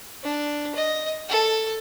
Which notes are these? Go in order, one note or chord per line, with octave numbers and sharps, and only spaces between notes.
D4
D#5
A4